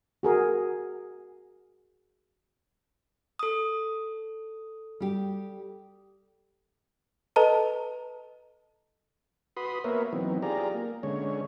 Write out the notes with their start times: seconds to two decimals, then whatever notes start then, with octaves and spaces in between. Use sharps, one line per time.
0.23 F#4 G#4 A#4
3.39 A4 D#6
5.00 G3 G4
7.36 A4 B4 D#5 A5 A#5
9.57 F#4 B4 B5 C6 D#6
9.84 A#3 B3 A#4 B4 C#5 E5
10.13 E3 F#3 B3 C4 D#4
10.43 F4 G4 G#4 D5 A#5
10.74 A#3
11.03 D3 G#3 C#4 C#5